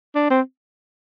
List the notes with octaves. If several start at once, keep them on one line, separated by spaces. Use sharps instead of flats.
D4
C4